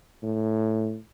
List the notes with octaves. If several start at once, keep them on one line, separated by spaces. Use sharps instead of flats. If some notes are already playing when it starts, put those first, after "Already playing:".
A2